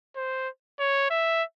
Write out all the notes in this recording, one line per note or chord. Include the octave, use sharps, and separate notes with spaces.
C5
C#5
E5